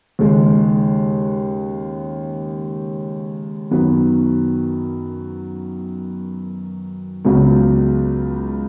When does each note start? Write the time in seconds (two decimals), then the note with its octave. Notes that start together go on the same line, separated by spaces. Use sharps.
0.19 D#2 C#3 G#3
3.71 F#2 D#3 F#3 B3
7.25 C#2 C#3 F#3 B3